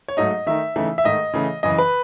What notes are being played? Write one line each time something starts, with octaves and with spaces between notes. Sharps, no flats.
C#5
G#2 F#3 A3 D#4 D#5
D#3 A3 D#4 E5
C#3 E3 A3 D#4
E5
G#2 D#3 A3 D#5
C#3 E3 A3
F#2 C#3 E3 D#5
B4